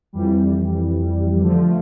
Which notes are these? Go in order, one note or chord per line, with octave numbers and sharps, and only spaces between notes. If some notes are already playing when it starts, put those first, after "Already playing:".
F2 E3 G3
D3 F3 A3